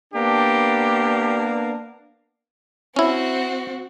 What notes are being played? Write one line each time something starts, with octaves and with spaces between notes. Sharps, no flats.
A#3 B3 D4 G4
C4 C#4 E4 F#4